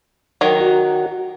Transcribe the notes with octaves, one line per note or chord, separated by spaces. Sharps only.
D#3 F#3
F#4